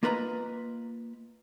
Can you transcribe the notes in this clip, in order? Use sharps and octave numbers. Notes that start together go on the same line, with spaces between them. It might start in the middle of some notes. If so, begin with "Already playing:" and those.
A#3 F4 A#4 B4 D#5 A#5